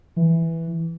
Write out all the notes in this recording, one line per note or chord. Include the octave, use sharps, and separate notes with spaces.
E3